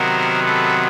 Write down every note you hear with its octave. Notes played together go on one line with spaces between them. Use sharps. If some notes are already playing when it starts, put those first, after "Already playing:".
Already playing: C3 D#3 F#3 B3 A#4 C5
A4 B4